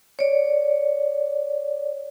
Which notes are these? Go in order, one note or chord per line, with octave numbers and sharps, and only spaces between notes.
C#5 D5